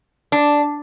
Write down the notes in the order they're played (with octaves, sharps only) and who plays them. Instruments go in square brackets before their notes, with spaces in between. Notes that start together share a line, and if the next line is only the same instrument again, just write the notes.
[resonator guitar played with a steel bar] D4